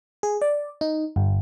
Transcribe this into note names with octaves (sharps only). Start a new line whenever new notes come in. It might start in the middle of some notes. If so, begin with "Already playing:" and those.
G#4
D5
D#4
G1